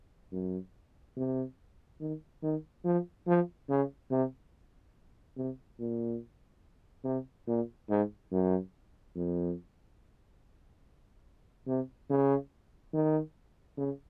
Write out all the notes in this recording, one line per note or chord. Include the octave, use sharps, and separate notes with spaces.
F#2
C3
D#3
D#3
F3
F3
C#3
C3
C3
A#2
C3
A#2
G#2
F#2
F2
C3
C#3
D#3
C#3